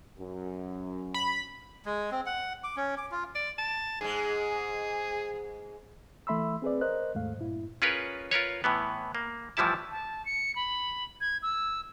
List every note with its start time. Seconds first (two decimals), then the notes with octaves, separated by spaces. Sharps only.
0.18 F#2
1.14 B5
1.85 G#3
2.11 C4
2.26 F#5
2.64 D6
2.76 C#4
2.97 D6
3.11 F4
3.35 D5
3.58 A5
4.01 G#2 G#3 G#4
6.27 E3 A3 E5 B5 C6 E6
6.62 C4 G#4 B4 D5
6.81 A#4 C5 D#5 F#6
7.15 D#2 G#2 A3 F5
7.37 G2 A#2 E4
7.82 C#4 F4 G#4 A#4 B4 C#5
8.31 F4 A#4 B4 C#5
8.64 A2 E3 B3
9.15 A#3
9.57 A2 E3 F3 G3 E4 A5
9.91 A5
10.25 C#7
10.56 B5
11.21 G#6
11.43 E6